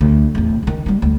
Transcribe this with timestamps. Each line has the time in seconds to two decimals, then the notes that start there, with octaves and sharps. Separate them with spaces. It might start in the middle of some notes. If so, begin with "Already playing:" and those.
0.01 D2 D3
0.35 D1 E2
0.63 C#2 D#3
0.86 G3 E4
1.02 D2